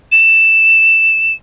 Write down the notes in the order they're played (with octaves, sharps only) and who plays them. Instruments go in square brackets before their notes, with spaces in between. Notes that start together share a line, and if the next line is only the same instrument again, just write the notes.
[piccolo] E7